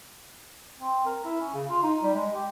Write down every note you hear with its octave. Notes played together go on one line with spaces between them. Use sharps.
C4
A#4
E4
C#4
C#3
F4
D#4
G3
G#3
G4